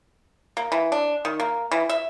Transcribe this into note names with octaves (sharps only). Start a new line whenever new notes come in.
A#3
E3
D4
D#3
A#3
E3
E5